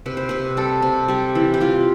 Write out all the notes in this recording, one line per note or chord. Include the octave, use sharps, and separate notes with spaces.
C3 B4
C5
C3 B4
G3 A4
C3
G3 G4
E3
G4
E3 F4